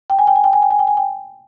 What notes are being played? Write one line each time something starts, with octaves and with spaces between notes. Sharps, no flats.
G5
G#5
G5
G#5
G5
G#5
G5
G#5
G5
G#5
G5